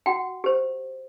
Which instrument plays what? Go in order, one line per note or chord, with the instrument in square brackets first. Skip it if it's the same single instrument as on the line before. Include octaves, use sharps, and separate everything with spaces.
[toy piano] F#4 F#5 G5
G4 C5